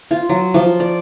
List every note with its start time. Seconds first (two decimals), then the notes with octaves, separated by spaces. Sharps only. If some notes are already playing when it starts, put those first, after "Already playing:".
0.11 F4
0.29 F#3
0.54 F3
0.80 D5